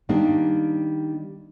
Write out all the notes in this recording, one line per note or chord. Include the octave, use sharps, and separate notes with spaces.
D#3 G3 A#3 D4